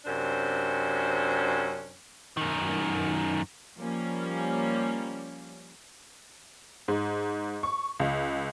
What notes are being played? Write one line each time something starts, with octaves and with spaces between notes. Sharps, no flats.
F#2 C3 C#4 D4 C5
F#2 D#3
F3 G3 A#3 C#4
G#2
C#6
C#2